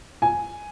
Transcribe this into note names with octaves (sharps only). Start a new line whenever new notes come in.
G#5